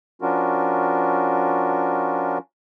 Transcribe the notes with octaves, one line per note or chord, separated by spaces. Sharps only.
F3 C#4 D4 F4 F#4 A#4